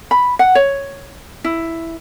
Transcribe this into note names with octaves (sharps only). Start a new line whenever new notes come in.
B5
F#5
C#5
E4